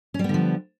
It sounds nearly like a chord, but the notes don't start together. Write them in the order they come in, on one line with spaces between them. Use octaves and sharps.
C#4 G3 B3 D3 F3